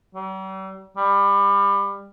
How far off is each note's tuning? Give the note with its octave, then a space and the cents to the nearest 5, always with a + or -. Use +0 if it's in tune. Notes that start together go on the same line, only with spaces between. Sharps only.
G3 -45
G3 +25